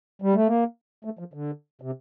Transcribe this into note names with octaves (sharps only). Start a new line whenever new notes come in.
G3
A3
A#3
A3
F3
D3
C3